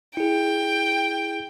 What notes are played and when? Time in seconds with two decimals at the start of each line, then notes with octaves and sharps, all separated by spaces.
0.17 E4 G#4 G5